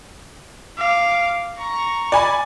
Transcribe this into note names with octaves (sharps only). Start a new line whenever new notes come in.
F5 D6
A#5 C#6
D5 G#5 B5